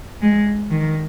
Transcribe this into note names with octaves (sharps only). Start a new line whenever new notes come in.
G#3
D#3